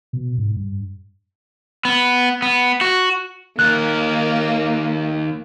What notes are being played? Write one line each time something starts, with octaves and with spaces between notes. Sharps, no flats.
B2
G#2
G2
B3
B3
F#4
D#2 A#3 A#4 F#6